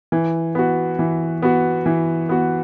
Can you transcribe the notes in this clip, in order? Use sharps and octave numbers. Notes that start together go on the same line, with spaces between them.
E3
B3 F#4
E3
B3 F#4
E3
B3 F#4